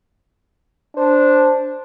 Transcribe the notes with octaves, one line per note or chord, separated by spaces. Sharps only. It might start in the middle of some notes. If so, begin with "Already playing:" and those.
D4 C5